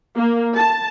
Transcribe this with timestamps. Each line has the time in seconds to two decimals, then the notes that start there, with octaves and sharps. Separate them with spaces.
0.17 A#3
0.57 A5